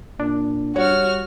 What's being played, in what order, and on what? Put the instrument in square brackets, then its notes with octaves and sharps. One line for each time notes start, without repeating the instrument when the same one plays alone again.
[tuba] A#2 [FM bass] D4
[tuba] G3 [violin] F#4 F6 [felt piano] C#5